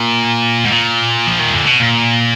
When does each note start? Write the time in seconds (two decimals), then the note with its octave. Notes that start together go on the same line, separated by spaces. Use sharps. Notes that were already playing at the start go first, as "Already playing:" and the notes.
Already playing: A#2
0.64 G#2
0.69 A#2
1.27 F3
1.39 D#3
1.53 D3
1.67 B2
1.80 A#2